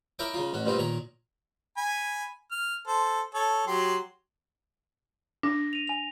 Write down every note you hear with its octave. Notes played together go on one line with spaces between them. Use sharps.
E4 A#4 C#5 D#5 G5 D6
C#3 D#4 F4
A1 C#4 F#4
G2 A#2 G3 B3 C4 D#4
A#2 D#3 C#5 A#5
G#5 B5
F6
A4 C5
A4 C#5
F#3 G4 C6
D4 A#6
D#7 F7
G#5 F7